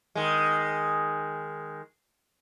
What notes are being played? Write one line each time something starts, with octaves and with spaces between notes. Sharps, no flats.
D#3 G#3